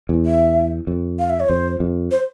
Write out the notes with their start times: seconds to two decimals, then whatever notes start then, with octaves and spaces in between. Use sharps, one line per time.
0.09 E2
0.26 E5
0.87 F2
1.19 F5
1.30 E5
1.40 C#5
1.49 F2 C5
1.80 F2
2.11 C5